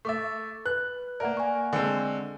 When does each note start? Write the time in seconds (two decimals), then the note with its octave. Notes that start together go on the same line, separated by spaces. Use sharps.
0.05 A3 E5 C#6 D6 A6
0.66 B4 F#6
1.20 A#3 A#4 D5 E5 F#5
1.37 G#5 C#6
1.73 D3 G#3 C4